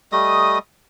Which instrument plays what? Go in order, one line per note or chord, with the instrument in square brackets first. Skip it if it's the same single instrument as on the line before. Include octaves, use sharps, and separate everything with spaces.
[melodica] G3 A3 D#5 D#6